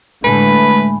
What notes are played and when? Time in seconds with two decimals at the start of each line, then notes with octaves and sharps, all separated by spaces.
0.24 A2 D3 G#3 A3 B4 B5